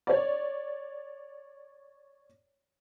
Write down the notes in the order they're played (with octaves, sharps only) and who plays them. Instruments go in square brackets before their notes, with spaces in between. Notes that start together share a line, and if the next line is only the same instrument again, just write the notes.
[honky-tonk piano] C#5 D5